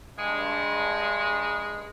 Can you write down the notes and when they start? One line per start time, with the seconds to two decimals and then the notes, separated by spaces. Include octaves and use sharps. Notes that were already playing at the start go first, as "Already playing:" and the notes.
0.17 G2 G#3